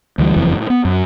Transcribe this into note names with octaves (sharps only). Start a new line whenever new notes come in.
D2 E3 G3
F#1 F2 E3
A2
B3
F#2